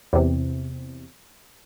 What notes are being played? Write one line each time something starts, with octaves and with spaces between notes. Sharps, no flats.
E2 C3